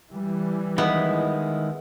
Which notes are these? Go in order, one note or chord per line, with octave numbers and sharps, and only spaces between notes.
E3 G3
D#3 G#3 B3 E4